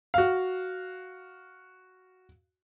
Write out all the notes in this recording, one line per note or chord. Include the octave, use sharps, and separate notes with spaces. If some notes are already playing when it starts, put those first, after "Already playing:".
F#4 F5